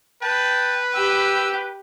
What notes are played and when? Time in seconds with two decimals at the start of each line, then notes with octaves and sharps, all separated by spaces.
0.22 B4 G5 A5
0.94 G4 E6